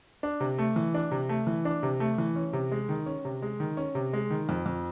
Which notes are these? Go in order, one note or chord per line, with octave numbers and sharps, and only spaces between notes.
D4
C3
A3
E3
D4
C3
A3
E3
D4
C3
A3
E3
C#4
C3
G#3
D#3
C#4
C3
G#3
D#3
C#4
C3
G#3
D#3
F2
F2